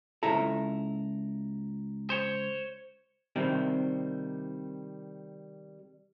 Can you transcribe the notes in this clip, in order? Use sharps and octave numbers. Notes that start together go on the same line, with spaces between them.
C#2 E4 A4 A#5
C5 C#5
C3 D#3 G3 C4